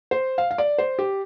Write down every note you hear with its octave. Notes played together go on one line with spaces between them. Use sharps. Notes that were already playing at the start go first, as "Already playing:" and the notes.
C5
F5
F5
D5
C5
G4